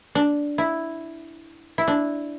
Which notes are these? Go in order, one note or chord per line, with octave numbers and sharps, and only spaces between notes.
D4
E4
E4
D4